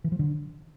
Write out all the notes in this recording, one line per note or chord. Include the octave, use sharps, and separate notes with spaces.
E3
F3
D3